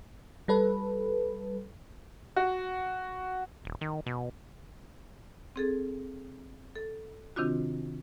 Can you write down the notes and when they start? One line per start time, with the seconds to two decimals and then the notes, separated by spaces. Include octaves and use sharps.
0.48 G3 A4 B4
2.36 F#4
3.65 D#1
3.81 D#3
4.06 B2
5.56 C4 G#4 A4
6.76 A4
7.36 C3 D#3 C4 D4 F4 F#4